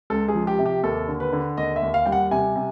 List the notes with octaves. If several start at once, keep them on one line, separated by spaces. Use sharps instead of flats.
C#2 A4
G#4
F3
G4
C3
G4
D#2 A4
D3
B4
D3
D#2 D#5
E5
D#2
F5
G3 G5
F#5
C3 G#5
C3